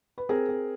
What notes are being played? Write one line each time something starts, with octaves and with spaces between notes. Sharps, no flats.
B4
C4 G#4 A#4
C4